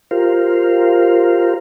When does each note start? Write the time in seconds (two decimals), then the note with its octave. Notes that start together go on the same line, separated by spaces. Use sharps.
0.11 F4 G4 A#4 C5 F5